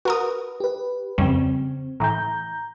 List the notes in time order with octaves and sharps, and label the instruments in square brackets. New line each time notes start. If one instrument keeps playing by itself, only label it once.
[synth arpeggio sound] F#4 A#4 D#6 [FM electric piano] B4
[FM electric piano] G4 B4
[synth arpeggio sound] F2 G3 C#4 [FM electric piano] C#3 C4
[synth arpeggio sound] A2 E3 [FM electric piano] A#5 G6